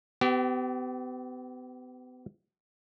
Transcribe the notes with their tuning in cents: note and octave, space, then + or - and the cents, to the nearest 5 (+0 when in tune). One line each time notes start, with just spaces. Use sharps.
B3 +35 G4 -25